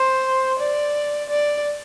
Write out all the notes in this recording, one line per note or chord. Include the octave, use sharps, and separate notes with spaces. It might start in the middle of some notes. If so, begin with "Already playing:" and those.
Already playing: C5
D5
D5